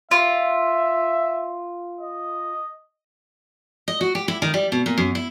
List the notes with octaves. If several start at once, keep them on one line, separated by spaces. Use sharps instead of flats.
F4 E5
D#5
D#5
F#4
G4
E4
D#3
G3
B2
A#2
F#2
E4